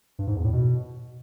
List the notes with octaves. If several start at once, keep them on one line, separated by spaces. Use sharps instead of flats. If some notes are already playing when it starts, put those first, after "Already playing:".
G2
G#2
E2
A2
B2